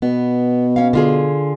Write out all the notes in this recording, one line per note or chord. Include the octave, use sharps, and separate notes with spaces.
B2 B3
C#4 F5
D3 F4 G#4